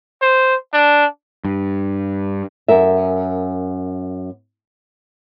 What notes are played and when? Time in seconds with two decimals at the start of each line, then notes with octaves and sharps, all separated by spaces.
0.22 C5
0.74 D4
1.44 G2
2.68 F#2 A#4 E5